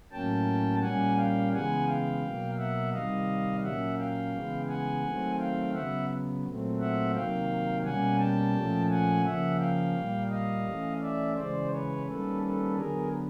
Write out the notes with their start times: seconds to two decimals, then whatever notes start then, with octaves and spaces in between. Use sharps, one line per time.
0.12 A2 F#3 A#3 C#4 G5 A5
0.82 A#2 G3 A#3 C#4 F#5 G#5
1.17 F5 G5
1.53 C#3 E3 G#3 B3 F#5 G#5
1.88 F5 G5
2.23 B2 F#3 A#3
2.58 E5 F#5
2.93 C3 D#3 G3 D#5 F5
3.63 A#2 F#3 A#3 C#4 E5 F#5
3.99 F5 G5
4.33 C#3 E3 G#3 B3
4.68 F#5 G#5
5.04 D#3 F#3 A3 C4
5.39 F5 G5
5.74 C#3 F#3 B3 E5 F#5
6.45 A#2 F#3 A3 C4
6.80 E5 F#5
7.14 C3 D#3 F#3 A#3 F5 G5
7.85 B2 G3 A#3 C#4 F#5 G#5
8.20 G5 A5
8.55 A#2 F3 A3 C#4
8.90 F#5 G#5
9.25 C#3 F3 A#3 C#4 E5 F#5
9.60 F5 G5
9.95 A#2 G3 A#3
10.30 D#5 F5
10.66 E3 A3 C#4
11.01 D5 E5
11.36 C#3 E3 G#3 C5 D5
11.71 B4 C#5
12.06 D#3 G3 A#3 C#4 A4 B4
12.42 A4 B4
12.77 D3 F#3 B3 G#4 A#4